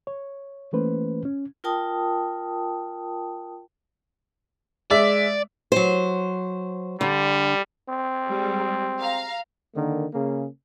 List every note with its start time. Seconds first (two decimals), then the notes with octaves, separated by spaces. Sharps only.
0.07 C#5
0.73 E3 A3 A#3 C#4 B4 C5
1.25 C#4
1.64 F4 A#4 G5 A5 D#6
4.90 G#3 D5 E5
5.72 F#3 C5
7.01 D3 G3
7.89 C4
8.28 G3 G#3
9.00 F5 A#5
9.74 D3 D#3 A#3
10.13 C#3 A#3 G#4